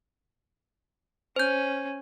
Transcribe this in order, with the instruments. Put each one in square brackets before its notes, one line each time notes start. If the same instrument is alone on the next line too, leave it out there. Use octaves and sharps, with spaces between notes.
[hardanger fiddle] C#4 [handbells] C5 G6